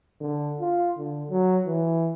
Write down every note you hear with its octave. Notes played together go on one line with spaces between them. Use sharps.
D3
F4
D3
F#3
E3